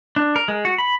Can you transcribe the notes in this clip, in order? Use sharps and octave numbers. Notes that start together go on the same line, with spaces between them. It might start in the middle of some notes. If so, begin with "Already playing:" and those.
D4
A#4
G#3
F#4
B5